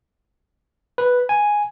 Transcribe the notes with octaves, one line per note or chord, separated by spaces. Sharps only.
B4
G#5